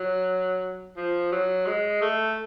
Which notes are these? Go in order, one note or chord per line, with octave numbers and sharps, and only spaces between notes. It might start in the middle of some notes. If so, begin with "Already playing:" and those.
Already playing: F#3
F3
F#3
G#3
A3